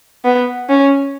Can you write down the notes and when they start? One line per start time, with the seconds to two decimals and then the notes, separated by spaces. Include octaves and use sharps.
0.25 B3
0.69 C#4